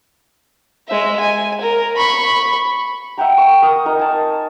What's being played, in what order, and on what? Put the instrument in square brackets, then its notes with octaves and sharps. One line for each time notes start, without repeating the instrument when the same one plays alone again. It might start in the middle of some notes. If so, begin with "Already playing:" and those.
[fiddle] G#3 E5
G#5
A#4
B5 C#6
[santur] E5 F#5 G5 A#5
C#6
A#4 D#6
D#4 A#4
G#5 A5